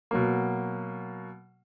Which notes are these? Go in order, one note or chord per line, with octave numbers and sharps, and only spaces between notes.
B2 F#3 A#3